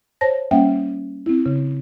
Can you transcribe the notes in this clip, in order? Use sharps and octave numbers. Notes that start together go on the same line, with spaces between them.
C5 C#5 A5 A#6
G3 A#3 C#4 E5 F#5 G5
C4 E4
C#3